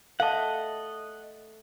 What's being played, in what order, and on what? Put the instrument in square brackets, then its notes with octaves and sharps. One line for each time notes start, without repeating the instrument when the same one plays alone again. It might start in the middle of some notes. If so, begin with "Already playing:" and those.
[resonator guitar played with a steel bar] A3 [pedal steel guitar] D#5 F#5 [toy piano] F5 A5